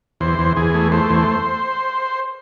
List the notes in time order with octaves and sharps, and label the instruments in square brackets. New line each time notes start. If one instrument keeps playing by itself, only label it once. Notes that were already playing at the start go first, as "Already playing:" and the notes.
[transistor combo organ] E2 C5
E2
E2 G#4
A3
A3 C5
E2